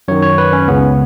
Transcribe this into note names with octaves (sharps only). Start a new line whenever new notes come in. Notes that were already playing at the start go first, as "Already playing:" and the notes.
F#2 D#3 C#5
C#5
B4
C#4
C#2 C#3 B3